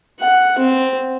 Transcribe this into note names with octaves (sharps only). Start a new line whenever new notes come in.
F#5
C4